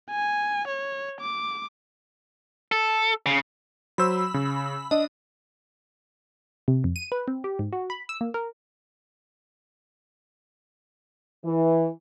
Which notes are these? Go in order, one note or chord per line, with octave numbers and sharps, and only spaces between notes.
G#5
C#5
D6
A4
C#3
F#3 C5 B5 E6
C#3
D4 D#5
C3
F2
D#7
B4
C4
G4
G#2
F#4
B5
E6
A#3
A#4
E3